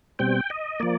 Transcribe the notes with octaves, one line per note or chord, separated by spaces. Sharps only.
B2 G3 C4 G5
D#5
F3 A#3 D5